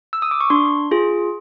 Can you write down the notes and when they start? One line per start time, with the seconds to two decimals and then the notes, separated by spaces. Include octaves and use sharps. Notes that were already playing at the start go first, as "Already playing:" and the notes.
0.13 E6
0.22 D#6
0.31 D6
0.41 C#6
0.50 D4 C6
0.91 F4 G#4